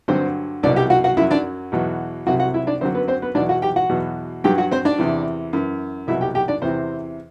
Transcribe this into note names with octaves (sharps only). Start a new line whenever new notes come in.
G2 D3 F#3 C4 C5
C2 B2 F#3 D4 D5
G4 G5
F#4 F#5
F#4 F#5
F#2 F#3 E4 E5
D4 D5
E2 B2 F#3
C2 C3 F#3 F#4 F#5
F#4 F#5
E4 E5
D4 D5
F#2 D3 F#3 C4 C5
B3 B4
C4 C5
B3 B4
E2 B2 F#3 D4 D5
F#4 F#5
G4 G5
F#4 F#5
E2 B2 F#3
G2 F#3 G4 G5
F#4 F#5
C4 C5
D4 D5
E2 C3 E3
F#2 E3
C2 B2 F#3 E4 E5
G4 G5
G4 G5
D4 D5
E2 C3 E3 C4 C5